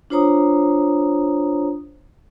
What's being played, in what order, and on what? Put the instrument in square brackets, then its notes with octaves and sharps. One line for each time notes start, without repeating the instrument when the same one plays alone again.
[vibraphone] D4 F4 C5 C#5 A#5 D#6